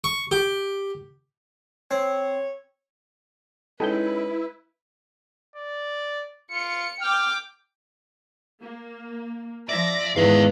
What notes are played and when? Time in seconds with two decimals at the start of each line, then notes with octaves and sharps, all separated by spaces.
0.04 C#6
0.31 G4
1.91 C4 C#5
3.80 G#3 C#4 D#4 E4 A4 B4 G5 G6
5.56 D5
6.52 F4 C#7
7.01 G5 D6 F6
8.63 A#3
9.69 F3 D5 E5 A#6
10.16 E2 G#2 D#3 B3 B4 F5